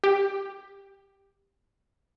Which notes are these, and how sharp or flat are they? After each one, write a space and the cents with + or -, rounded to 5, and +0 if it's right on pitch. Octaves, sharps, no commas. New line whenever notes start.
G4 +20